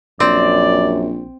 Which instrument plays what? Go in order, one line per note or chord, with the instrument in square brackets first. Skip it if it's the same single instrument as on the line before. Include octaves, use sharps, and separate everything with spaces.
[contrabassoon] A#1 [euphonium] F#2 [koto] C4 [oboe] D5